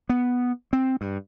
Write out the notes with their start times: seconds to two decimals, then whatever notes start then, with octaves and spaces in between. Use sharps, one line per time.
0.09 B3
0.73 C4
1.01 G2